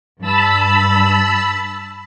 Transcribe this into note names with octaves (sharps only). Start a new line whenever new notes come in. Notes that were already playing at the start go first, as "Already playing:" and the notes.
G2 A5 B5 E6